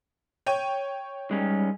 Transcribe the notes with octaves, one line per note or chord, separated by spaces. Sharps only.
C#5 G5 D#7
G3 G#3 C#4 D#4